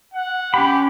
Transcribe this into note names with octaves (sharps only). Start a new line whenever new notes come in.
F#5
C#4 G4 B5